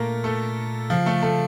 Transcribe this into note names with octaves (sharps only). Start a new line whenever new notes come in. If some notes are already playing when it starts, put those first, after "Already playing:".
Already playing: A#2 A3 A#3 A#4
A3 A4
C#3 F3 F4
A3 A4
A3 A4